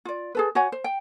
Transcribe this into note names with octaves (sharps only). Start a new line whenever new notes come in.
F4 D5
G#4 A4 B4
F#4 C#5 F#5 G#5
C5
G5